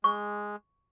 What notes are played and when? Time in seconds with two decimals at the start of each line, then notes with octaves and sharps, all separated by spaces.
0.04 G#3 C#6